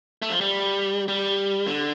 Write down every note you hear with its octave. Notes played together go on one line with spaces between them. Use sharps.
A3
F3
G3
G3
D3